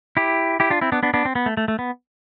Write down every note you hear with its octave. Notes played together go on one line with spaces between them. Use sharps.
E4 G4
E4 G4
D4 F4
C4 E4
B3 D4
B3 D4
B3 D4
C4
B3
A3
A3
A3
B3